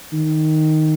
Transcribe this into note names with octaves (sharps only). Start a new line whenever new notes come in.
D#3